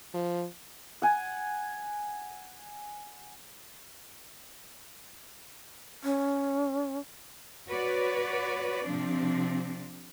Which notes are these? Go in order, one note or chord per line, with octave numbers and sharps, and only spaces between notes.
F3
F#5 G#5
C#4
F#4 B4 C#5 D5
C3 F3 C4 D4